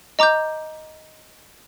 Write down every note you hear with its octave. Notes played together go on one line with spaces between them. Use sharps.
D#5 A#5 D6 G6